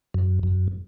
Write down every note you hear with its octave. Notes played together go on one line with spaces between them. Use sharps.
F#2
F#2